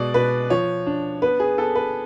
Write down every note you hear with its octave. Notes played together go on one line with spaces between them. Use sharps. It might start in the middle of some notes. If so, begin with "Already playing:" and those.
Already playing: B2 G#3 D5
B2 B4
F3 C#5
D4
B3 B4
G#4
B3 A4
B4